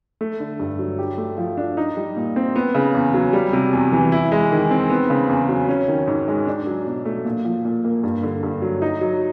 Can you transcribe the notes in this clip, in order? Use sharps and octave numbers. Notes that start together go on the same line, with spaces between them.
A3
D3
G2
F#3
G4
A3
F3
D4
D#4
G3
A#2
C4
B3
C#3
E2
F#3
G3
C3
E2
E3
E4
G#3
D#3
C4
B3
C#3
E2
F#3
C#4
D#3
G#2
G#3
D4
F#3
B2
A3
A#2
F3
A#2
A#3
G2
D3
G2
F#3
D#4
F#3